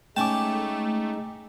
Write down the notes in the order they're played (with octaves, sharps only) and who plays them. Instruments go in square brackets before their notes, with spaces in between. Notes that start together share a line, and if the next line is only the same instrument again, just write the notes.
[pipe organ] G#3 D#4 [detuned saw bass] A3 [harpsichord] C#4 A5 [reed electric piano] G5 D6